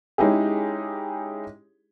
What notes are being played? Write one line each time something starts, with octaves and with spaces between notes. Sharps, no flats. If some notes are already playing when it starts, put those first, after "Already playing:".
G#3 C#4 D#4 E4 G4 G#4